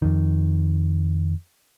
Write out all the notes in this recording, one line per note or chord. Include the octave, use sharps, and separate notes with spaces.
F2 D#3